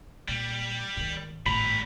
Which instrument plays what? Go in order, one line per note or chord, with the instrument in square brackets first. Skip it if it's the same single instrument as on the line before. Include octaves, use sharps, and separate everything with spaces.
[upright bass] A#2 [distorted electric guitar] G3
[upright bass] G#2 D#3
[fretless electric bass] G#1 [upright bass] A2 A3 [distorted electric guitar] G3 A#5 [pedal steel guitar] B5